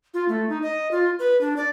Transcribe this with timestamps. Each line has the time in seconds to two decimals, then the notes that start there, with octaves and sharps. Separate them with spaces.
0.14 F4
0.29 A3
0.49 D#4
0.62 D#5
0.91 F4
1.19 B4
1.41 D4
1.57 D5